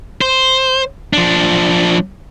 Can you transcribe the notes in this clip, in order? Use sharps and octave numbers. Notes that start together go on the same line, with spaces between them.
C5
F3 D4